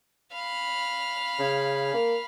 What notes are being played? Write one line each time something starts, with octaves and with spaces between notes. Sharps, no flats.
F5 B5
C#3
A#3